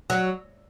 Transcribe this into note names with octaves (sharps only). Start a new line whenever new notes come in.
F#3